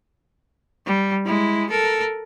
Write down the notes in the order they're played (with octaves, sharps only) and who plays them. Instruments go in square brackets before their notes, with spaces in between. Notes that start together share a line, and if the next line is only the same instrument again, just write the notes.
[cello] G3
G#3 E4
A4 A#4